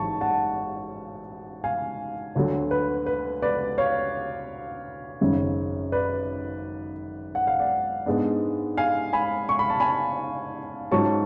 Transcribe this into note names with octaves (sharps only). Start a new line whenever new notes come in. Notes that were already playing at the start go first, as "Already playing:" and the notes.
Already playing: A1 G#2 F#3 A5 C#6
F#5 A5
F5 G#5
D2 D3 F#3
B4
B4
B4 D5
C#5 F5
G#1 F#2 C#3
B4 D5
F#5
F5
D5 F#5
G#2 G#3 B3 D4
F5 G#5
G#5 B5
C#6
B5
A5
G#5 B5
G#2 F#3 C#4 F4 A5 C#6